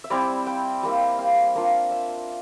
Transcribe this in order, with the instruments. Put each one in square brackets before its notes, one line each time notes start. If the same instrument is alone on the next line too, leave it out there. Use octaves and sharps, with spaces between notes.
[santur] E5
G3 C4 E4 D5
G5
G3 A#3 E4
F5
A#3 D4 F4
E5